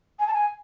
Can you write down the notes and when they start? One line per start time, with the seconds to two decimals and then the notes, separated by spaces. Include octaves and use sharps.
0.19 G#5
0.27 A5
0.33 G#5